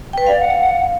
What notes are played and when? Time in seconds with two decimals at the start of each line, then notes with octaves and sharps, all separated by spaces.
0.13 B4 G5
0.27 D5 F5
0.40 F#5